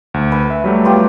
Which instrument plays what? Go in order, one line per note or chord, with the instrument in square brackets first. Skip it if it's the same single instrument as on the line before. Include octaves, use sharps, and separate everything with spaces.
[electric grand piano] D2
[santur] B4 G#5
[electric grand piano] E5
F#3 G3 A3
[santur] B3 F4 G4